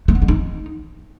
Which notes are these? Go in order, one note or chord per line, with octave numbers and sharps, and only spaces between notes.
A3
B3
G#3
D#4